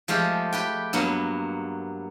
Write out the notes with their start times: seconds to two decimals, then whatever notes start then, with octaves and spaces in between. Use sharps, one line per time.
0.08 F3 G#3 A3 F4 G4
0.53 G4 B4 G5
0.93 G2 F#3 A#3 B3